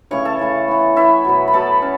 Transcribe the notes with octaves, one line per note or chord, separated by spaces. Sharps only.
C#3 E3 A3 C#5 C#6
A4 A5
C#3 E3 A3
E3 B3
E3 B3 E4 E5
B2 F#3 B3
B5
B2 F#3 B3 A4 A5
C#4